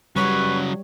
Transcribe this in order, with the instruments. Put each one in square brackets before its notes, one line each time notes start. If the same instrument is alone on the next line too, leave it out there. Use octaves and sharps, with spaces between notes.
[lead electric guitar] C#3 F#3 [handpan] G3 C#5 [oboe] B4 [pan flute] C#6